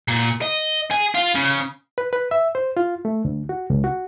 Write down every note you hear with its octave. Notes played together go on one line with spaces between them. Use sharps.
A#2
D#5
G#4
F4
C#3
B4
B4
E5
C5
F4
A3
D2
F#4
C#2
F#4